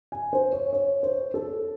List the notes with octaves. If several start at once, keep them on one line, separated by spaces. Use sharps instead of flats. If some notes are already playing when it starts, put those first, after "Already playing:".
G#5
C5
C#5
C#5
C5
A4